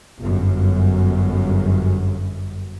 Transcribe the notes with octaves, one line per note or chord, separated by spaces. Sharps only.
G1 F#2